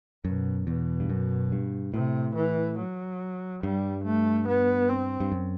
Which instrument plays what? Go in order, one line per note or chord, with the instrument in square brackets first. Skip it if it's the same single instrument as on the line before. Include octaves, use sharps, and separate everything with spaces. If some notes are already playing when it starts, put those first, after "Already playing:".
[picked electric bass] F#2 [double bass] B2
[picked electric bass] E2 [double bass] B2
[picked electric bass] G2
F#2
G2
[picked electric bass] A2 [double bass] C3
[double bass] E3
F#3
[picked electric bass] G2 [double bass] G3
[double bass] A3
B3
C4
[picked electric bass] G2
F#2